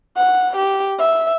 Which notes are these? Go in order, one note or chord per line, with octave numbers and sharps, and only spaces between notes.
F#5
G4
E5